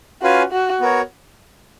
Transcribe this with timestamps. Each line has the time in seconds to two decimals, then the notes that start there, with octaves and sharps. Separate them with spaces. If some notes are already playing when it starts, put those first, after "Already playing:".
0.22 C#4 F4 F#4 B4 F5 G#5
0.52 F#4
0.80 B3 F#4 A#4 C#5